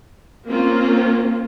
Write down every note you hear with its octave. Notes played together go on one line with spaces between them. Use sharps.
A#3 C4 C#4 F4